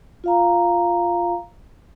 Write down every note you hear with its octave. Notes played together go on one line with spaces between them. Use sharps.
F4 F5 A#5